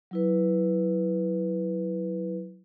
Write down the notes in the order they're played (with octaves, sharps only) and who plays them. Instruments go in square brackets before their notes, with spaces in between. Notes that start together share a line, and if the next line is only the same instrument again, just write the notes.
[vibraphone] F#3 E4 B4